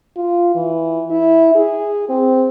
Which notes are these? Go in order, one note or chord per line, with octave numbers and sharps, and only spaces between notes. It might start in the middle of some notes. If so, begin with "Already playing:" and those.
F4
E3
E4
G#4
C4